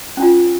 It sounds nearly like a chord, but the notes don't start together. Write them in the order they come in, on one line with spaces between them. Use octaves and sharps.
C#4 D4 F4